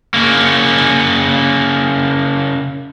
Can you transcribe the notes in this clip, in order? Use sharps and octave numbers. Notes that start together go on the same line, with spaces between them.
C#3 A#3